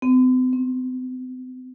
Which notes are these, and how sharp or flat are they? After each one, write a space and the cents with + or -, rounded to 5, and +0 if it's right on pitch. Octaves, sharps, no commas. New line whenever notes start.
C4 -45
C4 +30